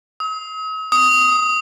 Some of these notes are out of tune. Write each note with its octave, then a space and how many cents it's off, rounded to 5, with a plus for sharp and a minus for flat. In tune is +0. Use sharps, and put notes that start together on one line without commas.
D#6 +45
D#6 +10